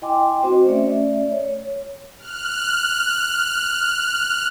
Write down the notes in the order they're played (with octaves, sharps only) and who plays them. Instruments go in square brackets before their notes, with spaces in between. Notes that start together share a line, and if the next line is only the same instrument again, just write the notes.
[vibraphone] E4 D#5 G5 G#5 C6 D6
C4 F#4 C5 D#5
A3 C#4 D5 E5
C#5
[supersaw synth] F6 F#6